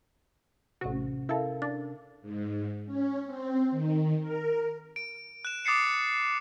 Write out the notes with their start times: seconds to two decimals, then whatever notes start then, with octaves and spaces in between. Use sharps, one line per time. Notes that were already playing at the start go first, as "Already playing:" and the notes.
0.81 A1 C3 C#4 F#4
1.29 E4 A4 A#4 F5
1.62 D4 A6
2.22 G#2
2.86 C#4
3.25 C4
3.71 D#3
4.22 A#4
4.96 D7
5.45 F#6 E7
5.65 D6 D#6 A6 C7 C#7 E7